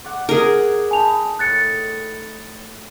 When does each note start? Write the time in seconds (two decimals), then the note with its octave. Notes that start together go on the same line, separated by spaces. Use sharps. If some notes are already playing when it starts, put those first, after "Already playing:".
0.04 D5 F#5
0.29 G#4 A#4
0.91 D#4 G#5 A5 B5 F7
1.39 A2 F#6 A6 C#7